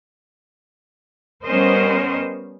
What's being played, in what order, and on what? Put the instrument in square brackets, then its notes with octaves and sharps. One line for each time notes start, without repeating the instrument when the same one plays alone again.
[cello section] G3 B3 C#4 A#4 C5 D#5